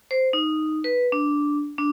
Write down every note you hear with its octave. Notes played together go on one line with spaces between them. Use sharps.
C5
D#4
B4
D4
D4